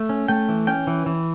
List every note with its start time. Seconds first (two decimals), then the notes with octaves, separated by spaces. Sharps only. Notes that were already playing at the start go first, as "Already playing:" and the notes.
Already playing: A3
0.09 C#4
0.28 A3 G5
0.49 E3
0.67 C#4 G5
0.87 E3
1.06 E3